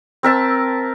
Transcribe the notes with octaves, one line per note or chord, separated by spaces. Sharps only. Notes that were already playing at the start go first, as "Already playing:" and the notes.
C4 A#4 E5 A5